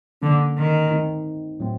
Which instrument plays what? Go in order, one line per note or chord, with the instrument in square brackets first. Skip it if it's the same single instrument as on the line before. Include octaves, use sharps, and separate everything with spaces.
[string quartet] D3 [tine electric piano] F3 A#3 C#4
[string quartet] D#3
[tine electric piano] A3 C4 D#4
A2 F#3 A3 C4